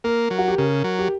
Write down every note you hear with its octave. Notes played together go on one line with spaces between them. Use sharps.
A#3 A#4
F#3
F#4
G4
C#3 A#4
F#3
G4